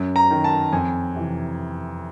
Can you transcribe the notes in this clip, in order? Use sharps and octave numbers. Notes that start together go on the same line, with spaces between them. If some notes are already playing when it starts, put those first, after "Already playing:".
Already playing: F#2
A#5
D#3
A5
F2 G#5
C3 E3